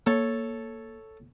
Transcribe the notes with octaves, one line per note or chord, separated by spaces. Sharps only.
A#3 A4 C#5 A5